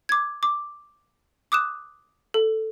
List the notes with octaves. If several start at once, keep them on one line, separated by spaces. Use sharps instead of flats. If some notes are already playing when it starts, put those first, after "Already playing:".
D6 G#6
D6
D6 D#6 F#6 E7
A4